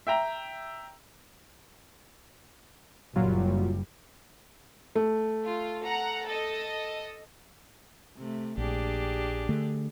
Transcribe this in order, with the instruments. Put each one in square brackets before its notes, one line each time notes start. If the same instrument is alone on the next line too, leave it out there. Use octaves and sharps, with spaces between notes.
[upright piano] E5 G5 A#5
[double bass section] F#1 G3 [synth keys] A#2 F#3 F4
[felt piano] A3
[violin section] F4
F#5 A#5
A4 D#5
[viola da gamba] C3 A3
[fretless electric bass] A#1 [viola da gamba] D4 G4 G#4
[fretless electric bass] D3 A3